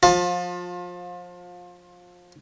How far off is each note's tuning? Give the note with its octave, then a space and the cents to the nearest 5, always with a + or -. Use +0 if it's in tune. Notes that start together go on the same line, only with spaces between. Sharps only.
F3 +25 F4 +30 A5 +0